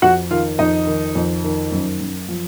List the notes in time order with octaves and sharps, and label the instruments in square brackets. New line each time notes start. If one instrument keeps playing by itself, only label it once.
[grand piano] F2 F#4 F#5
D#3 F4 F5
F2 D#4 D#5
D#3
F2
D#3
F#2
F#2
F3